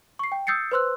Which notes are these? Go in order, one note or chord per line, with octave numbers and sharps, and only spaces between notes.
C#6 C7
G5
D#6 E6 G6 A6 C7 C#7
B4 C5 C6 E6 F#6